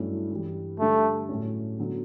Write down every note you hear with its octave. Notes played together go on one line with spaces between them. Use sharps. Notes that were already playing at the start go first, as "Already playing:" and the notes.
Already playing: G2 F#3 A3 C#4 E4
G2 E3 G3
D3 G3 A3 D4
A2 F#3 A3 C#4
D3 F#3 B3